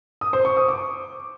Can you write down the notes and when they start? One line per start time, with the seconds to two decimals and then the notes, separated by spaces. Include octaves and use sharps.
0.21 D#6
0.33 C5
0.45 C#6
0.57 D#6
0.68 D6